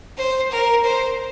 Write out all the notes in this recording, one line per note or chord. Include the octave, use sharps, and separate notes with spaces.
C5
A#4
C5